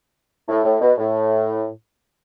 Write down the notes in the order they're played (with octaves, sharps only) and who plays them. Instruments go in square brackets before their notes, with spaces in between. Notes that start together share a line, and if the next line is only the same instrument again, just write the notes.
[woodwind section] A2
A2
B2
A2